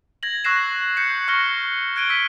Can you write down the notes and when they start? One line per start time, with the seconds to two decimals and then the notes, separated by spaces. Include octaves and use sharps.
0.23 G#6 A#6 F#7
0.44 C#6 E6 F#6 A#6 C7 E7
0.97 G6 C7 C#7
1.28 C#6 F6 A#6 G7
1.96 F#6 G#6 D7 D#7 G7
2.10 E6 B6